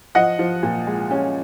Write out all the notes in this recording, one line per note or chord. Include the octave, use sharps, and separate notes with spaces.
F3 D#5 F#5
F3
A#2
G#3
C#4